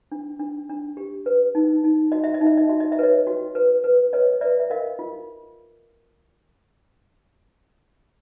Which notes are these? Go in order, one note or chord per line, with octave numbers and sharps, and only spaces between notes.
D4
D4
D4
G4
B4
D#4
D#4
F#4 D#5
E5
D#5
D#4
E5
D#5
F#4 E5
D#5
E5
B4 C#5 D#5
F#4
B4
B4
B4 C#5 D#5
B4 D5 E5
E5
A#4 D#5 F5
F4